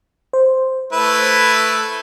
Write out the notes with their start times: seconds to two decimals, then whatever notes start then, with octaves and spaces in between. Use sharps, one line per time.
0.33 C5
0.93 A3 E4 B4